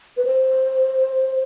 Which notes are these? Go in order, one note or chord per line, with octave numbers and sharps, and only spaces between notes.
B4
C5